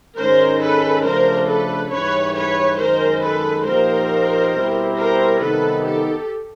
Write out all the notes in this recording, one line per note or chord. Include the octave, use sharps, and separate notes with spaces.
G#2 D#3 G#3 C#4 A#4 C5
A4 B4
C#3 F3 A3 D4 A#4 C5
A4 B4
G#2 E3 G3 B4 C#5
B4 C#5
F#2 D#3 G#3 A#4 C5
A4 B4
A#2 F3 A#3 D#4 G4 A#4 C5
B2 G3 C4 E4 G4
A#4 C5
C3 D#3 G3 B3 D#4 A4 B4
G4 A4